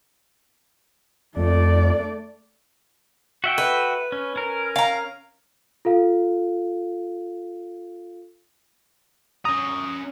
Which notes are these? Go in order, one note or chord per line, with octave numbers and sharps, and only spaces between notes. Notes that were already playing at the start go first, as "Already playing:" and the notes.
F2 A3 D5
F#4 E5 G5
B4
C#4
C#4 A#4
F5 A#5
F4 A4 F5
C#4 A#5 D#6